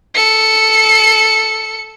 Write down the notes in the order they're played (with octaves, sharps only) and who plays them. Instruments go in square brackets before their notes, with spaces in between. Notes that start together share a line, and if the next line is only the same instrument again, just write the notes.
[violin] A4 C#7